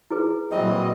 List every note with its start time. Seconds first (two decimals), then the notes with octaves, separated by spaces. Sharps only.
0.11 E4 G#4 B4
0.51 A#2 E3 F#3 G3 C4 D#5